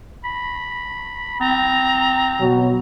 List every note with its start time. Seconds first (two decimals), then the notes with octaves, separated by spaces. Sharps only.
0.24 B5
1.40 C4 A#5
2.41 B2 F#3